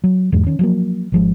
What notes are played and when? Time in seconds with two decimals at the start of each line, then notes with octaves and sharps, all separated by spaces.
0.04 F#3
0.32 E2 G#2 G#3
0.47 D#3 C#4
0.59 F3 F#3 A#3
1.12 G#1 F3 G#3